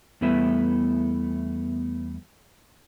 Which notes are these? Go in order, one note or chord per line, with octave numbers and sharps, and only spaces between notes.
E2 G3 A3 B3 E4 E5